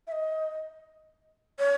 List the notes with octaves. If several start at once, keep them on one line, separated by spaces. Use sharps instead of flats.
E5
D#5
C#5